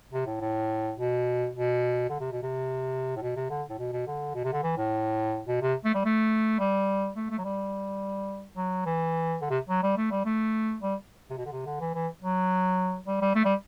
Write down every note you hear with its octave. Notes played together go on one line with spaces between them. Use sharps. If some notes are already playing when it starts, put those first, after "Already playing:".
C3
A2
A2
B2
B2
D3
C3
B2
C3
A2
B2
C3
D3
A2
B2
B2
D3
B2
C3
D3
E3
A2
B2
C3
A3
G3
A3
G3
A3
A3
F#3
G3
F#3
E3
D3
C3
F#3
G3
A3
G3
A3
G3
C3
B2
D3
C3
D3
E3
E3
F#3
G3
G3
A3
G3